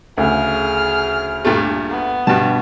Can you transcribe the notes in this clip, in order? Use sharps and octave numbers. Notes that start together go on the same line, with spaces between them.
D2 C#3 G#4 F6
G2 A#2 A3
B3
G2 B2 G3 A5